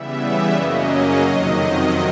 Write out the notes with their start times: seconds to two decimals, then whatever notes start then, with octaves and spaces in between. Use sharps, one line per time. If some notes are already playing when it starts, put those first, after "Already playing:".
Already playing: C#3 E3 G3 B3 E5
0.53 F#2 C#3 F#3 A#3 C#4 D#5
1.18 F2 C3 D#3 F#3